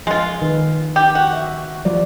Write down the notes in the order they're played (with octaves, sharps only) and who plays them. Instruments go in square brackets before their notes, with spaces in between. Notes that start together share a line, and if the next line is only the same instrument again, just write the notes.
[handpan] F3 [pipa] G#3 F4
[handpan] D#3 B4
[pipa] G4
F#4
[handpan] E5
F3 G3 D5